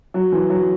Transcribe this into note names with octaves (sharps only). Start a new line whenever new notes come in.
F#3
E3
F#3